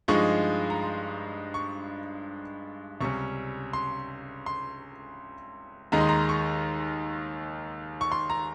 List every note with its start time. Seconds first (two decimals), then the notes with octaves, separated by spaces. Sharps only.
0.08 G2 F3 G#3 D#4 C#6
0.70 A#5
0.81 C6
1.54 C#6
3.01 C#2 C3 G3 C#4 C#6
3.73 C6
4.46 C6
5.92 D#2 D#3 G#3 D#4 A#5
6.01 C6
6.09 A#5
6.29 C#6
8.01 C#6
8.12 C6
8.30 A#5